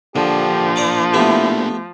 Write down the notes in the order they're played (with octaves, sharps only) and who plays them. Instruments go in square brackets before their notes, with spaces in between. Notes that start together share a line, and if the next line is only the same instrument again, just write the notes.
[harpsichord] D3 [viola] F3 [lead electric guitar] A#3 D4 [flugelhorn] G4
[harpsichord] D5 A#5 D6
[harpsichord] A3 B3 G4 [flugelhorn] E4